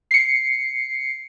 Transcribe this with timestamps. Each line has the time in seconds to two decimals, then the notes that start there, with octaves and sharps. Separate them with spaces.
0.11 C7 C#7